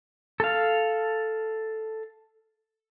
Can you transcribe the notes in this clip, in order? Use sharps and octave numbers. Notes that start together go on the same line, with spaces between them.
A4 F5